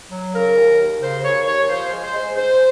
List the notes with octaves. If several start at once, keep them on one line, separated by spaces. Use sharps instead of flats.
F#3
C#3 A#4
D#2
D#2
C#3 C5
D#2 C#5
D#2 C#5
F3 C5
G#3
C5
G#3
G#2 C5